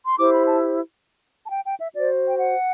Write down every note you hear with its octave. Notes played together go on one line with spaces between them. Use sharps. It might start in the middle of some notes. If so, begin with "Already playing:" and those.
C6
E4 G4 C5 D6
B5
A5
A5
G5
G5
E5
F#4 C5 D5
G5
F#5